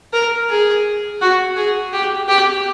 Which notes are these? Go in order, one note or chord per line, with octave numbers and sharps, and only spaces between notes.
A#4
G#4
F#4
G#4
G4
G4